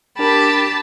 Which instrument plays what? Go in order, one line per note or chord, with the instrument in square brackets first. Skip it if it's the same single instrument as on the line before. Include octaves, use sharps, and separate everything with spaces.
[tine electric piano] D4 A#4 [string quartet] G4 [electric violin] A5 [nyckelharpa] B5